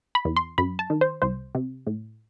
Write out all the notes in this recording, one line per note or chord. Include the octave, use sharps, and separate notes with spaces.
B5
E2
C6
F#2 B5
A5
D#3
C5
C2 C5
C3
A2